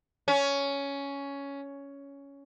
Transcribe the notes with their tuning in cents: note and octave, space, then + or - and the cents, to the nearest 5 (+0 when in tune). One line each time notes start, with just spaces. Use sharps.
C#4 +10